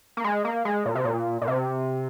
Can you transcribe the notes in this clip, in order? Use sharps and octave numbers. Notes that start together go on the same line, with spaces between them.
A#3
G#3
A#3
G#3
A#2
C3
A#2
A#2
C3